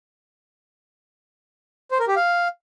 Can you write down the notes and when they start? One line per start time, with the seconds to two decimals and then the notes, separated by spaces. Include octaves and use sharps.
1.91 C5
1.99 A#4
2.08 G4
2.16 F5